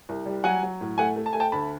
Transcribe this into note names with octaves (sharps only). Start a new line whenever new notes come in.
C2
G3
F#3 F#5 G#5
F#3
A2
A3 F#5 G#5
A3
A5
A3 G#5
G5 A5
D2 A5 B5